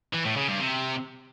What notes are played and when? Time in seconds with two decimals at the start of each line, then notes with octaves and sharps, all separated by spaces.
0.13 E3
0.25 A2
0.36 C#3
0.48 G2
0.60 C3